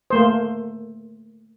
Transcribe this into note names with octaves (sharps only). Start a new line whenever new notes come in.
A3 A#3 C5